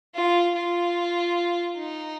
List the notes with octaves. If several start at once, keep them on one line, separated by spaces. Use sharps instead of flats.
F4
F4
D#4